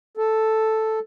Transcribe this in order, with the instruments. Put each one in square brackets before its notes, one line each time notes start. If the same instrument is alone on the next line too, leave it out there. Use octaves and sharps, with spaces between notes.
[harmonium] A4